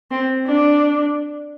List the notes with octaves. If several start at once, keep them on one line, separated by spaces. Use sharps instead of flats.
C4
D4